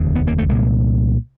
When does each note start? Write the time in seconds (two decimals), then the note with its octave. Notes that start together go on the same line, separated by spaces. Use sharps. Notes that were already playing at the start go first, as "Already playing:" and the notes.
Already playing: F1 D#2 C#3
0.15 B3
0.27 A#3
0.38 A3
0.49 C2 A#2 G#3